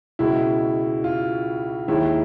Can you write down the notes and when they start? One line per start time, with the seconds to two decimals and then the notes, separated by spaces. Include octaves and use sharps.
0.19 C#2 B2 G#3 E4
1.04 F4
1.88 D#2 D#3 G#3 E4